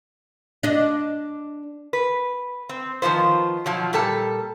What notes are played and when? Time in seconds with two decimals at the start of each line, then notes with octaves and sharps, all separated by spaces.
0.63 D4 D#5
1.93 B4
2.69 C4
3.02 D#3 F3 B3 F4 C5
3.66 B2 F3 F#3
3.93 A#2 G3 A4 A5